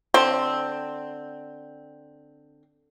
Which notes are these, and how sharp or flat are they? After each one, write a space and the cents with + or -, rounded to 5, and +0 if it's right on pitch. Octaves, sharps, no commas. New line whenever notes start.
D3 +10 C4 +0 C6 +0